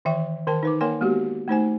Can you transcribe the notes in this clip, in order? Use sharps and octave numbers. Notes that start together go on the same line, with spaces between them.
D#3 E3 E5 G5 C#6
D#3 A#4 G5 A5
D#4 B4 D6
A#3 A#4 C#5 G5 G#5 C6
G#3 A#3 B3 F#4 G4
A3 D#4 C5 G#5